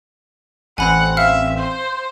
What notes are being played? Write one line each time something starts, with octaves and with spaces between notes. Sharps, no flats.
A1 C4 F#5 G#5 B5
E5 F5 F6
C5